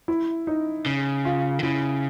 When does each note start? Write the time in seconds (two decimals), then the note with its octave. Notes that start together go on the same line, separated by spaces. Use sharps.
0.08 E4
0.47 D#4
0.86 C#3
1.25 F4
1.59 D3
1.63 C#3 E4